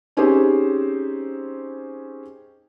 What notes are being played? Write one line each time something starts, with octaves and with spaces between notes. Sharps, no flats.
C4 C#4 D#4 G4 G#4 C5